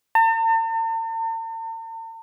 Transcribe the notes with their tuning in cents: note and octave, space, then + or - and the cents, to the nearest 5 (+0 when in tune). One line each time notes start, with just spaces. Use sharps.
A5 +45